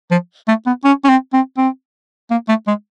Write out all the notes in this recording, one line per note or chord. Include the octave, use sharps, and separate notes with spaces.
F3
A3
B3
C#4
C#4
C4
C4
C4
A#3
A3
G#3